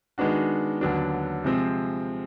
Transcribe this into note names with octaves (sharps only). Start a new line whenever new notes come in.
D#3 G#3 B3 D4 F#4
D#2 D3 F#3 B3 D4
C3 F3 G#3 C4